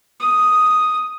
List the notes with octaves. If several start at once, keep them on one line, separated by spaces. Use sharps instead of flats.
D#6